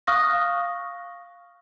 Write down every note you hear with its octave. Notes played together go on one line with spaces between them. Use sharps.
F5 C#6 D#6 F6 F#6 A#6